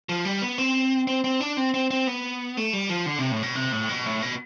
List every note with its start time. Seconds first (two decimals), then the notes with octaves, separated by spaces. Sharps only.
0.09 F3
0.25 G3
0.42 B3
0.58 C4
1.07 C4
1.24 C4
1.40 D4
1.57 C4
1.74 C4
1.91 C4
2.07 B3
2.57 A3
2.73 G3
2.89 F3
3.06 D3
3.19 C3
3.32 A2
3.43 B2
3.55 C3
3.72 A2
3.89 B2
4.06 A2
4.22 B2